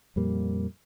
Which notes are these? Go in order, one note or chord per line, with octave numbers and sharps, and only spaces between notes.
F2 A#2 G3 A#3